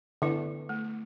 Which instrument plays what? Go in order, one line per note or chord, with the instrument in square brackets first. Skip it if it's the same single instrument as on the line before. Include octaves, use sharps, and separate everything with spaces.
[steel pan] D3 [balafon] B3 E4 B4
[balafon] A3